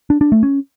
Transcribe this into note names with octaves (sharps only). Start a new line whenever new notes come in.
D4
D4
A3
C#4